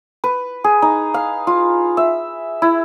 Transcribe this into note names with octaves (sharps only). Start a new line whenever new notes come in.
B4
G#4
D#4
F5
F4
E5
E4